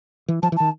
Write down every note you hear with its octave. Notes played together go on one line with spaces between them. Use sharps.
E3
F3 A5
E3
D#3 A5